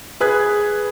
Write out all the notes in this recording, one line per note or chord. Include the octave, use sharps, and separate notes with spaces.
G#4 B4 F#6 G#6